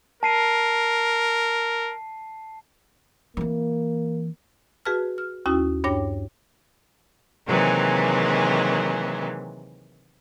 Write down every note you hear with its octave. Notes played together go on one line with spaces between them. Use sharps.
A#4 A5 C7 D#7
E3 A#3 C4
F#4 G#4 B4 A5 F6
F6
D#2 C#4 E4 F#4 D#6
G2 D4 C#5 G5 D6 A#6
C3 D#3 E3 F#3 G#3 A#3